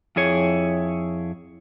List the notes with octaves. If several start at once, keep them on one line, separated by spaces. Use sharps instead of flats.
F2 E4 G#4 C#5